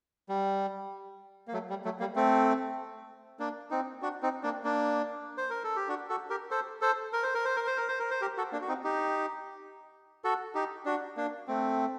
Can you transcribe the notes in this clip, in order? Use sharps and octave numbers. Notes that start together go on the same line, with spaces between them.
G3
A#3
F#3 A3
G3
F#3 A3
G3 A#3
A3 C4
A#3 D4
C4 D#4
D4 F#4
C4 D#4
A#3 D4
A#3 D4
C5
A#4
A4
G4
D4 F#4
F#4 A4
G4 A#4
A4 C5
A4 C5
A#4
C5
A#4
C5
A#4
C5
A#4
C5
A#4
C5
G4 A#4
F#4 A4
A#3 D4
F#4
C4 D#4
D#4 G4
F#4 A4
D#4 G4
D4 F#4
A#3 D4
A3 C4